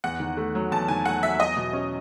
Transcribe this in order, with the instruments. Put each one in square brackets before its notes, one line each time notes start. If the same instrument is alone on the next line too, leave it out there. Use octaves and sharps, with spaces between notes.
[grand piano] E2 [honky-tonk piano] F#5
[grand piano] D#3
A3
F#3
[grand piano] E2 [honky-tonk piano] A5
[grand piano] D#3 [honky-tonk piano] G#5
[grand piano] A3 [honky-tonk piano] F#5
[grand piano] F#3 [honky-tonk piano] E5
[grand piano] E2 [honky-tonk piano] D#5
[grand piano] B2
C#4